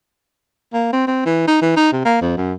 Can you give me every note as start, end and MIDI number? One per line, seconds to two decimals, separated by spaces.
0.74 0.88 58
0.93 1.07 60
1.07 1.23 60
1.26 1.46 52
1.48 1.58 63
1.62 1.76 52
1.77 1.92 63
1.92 2.03 48
2.05 2.17 58
2.21 2.36 41
2.37 2.54 42